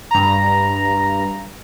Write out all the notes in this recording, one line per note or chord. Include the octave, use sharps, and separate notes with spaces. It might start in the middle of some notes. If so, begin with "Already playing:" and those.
G2 A#5